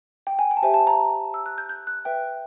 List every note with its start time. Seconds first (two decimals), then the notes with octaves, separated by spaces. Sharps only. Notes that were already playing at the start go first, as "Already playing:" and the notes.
0.27 G5
0.39 G#5
0.51 G5
0.57 A5
0.62 G4 C5 E5 G#5
0.74 A5
0.87 A#5
1.34 E6
1.46 F#6
1.58 G6
1.69 G6
1.87 F#6
2.05 B4 E5 G5